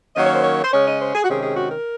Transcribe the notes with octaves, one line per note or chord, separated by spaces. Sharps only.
D#3 F#3 A#3 C#4 D#5
C#5
C5
C#5
C5
C#3 G#3 C#4 C#5
D#5
C5
G#4
F#4
C3 D#3 G#3 C#4 G#4
G#4
F#4
A#4